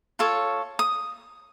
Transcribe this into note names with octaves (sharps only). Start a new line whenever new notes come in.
F4 A4 C#5
D#6